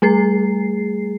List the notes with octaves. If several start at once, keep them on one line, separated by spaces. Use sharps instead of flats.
G3 A3 G#4 C7